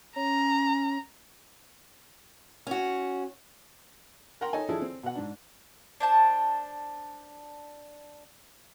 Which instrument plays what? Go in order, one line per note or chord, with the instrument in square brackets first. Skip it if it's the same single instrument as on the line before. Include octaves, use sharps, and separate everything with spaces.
[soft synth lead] C#4 [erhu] A#5
[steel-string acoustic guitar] C#4 F#4
[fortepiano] A#4 F#5 G5 A#5 C6
D#4 A4 C#5 D#5 G#5
F3 D4 E4 G#4 A4 D5
C4
B2 F#5
G#2 D4
[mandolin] D4 C5 A5